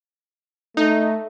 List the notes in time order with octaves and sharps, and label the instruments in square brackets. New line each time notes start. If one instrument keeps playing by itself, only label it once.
[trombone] A3 [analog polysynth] D#4